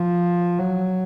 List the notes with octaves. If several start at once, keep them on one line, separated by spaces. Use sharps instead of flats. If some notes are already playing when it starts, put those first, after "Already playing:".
Already playing: F3
F#3